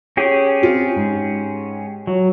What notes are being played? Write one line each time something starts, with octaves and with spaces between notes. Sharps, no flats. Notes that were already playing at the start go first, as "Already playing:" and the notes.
C#4 G4 G#4
C4 F4
G#2
F#3